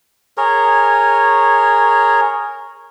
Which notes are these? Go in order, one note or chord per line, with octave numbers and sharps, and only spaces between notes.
G#4 A#4 C#5